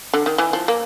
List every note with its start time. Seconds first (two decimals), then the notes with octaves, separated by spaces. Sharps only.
0.14 D3
0.26 D#3
0.38 E3
0.53 F3
0.68 A#3